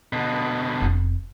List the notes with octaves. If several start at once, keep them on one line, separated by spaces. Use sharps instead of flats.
B2 D3
F1